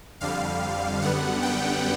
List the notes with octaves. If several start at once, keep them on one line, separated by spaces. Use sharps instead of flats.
F2 D3 G3 F5
F#2 D3 G3 B3 F#5
G5